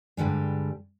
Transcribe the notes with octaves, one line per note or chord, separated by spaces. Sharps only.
G2 D3 G3 G#3